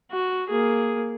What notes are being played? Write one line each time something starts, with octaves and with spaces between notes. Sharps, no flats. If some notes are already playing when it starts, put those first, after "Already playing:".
F#4
A#3 G#4